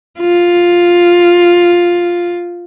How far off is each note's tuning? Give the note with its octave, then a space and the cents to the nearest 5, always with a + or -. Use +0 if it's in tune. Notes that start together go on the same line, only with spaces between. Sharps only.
F4 +5